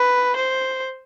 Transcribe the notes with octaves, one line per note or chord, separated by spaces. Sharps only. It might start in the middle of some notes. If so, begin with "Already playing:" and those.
Already playing: B4
C5